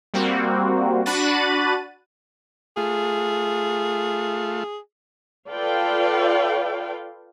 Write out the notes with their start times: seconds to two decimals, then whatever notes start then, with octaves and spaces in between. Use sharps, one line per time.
0.14 G3 A#3 C4 F#4
1.06 D4 F#4 B5 F#6 A6 D#7
2.77 A3 F4 G#4
5.51 F4 A4 B4 D5 F5 G5